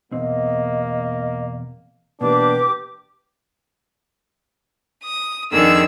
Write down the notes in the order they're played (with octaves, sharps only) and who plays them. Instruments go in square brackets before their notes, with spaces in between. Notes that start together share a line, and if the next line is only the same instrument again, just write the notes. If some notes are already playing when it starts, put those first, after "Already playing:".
[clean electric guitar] E2 B2 C4 [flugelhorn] A#3 [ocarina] D#5
[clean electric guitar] B2 E3 A#3 [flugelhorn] D4 [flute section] G4 D6 [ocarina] B4
[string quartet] D#6
F2 D3 D#3 G#4 E6